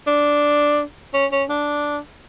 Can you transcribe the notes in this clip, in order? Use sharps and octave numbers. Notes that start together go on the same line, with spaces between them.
D4
C#4
C#4
D4